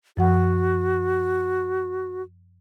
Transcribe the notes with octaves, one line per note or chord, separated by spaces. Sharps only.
F#2 F3 F#4 F#5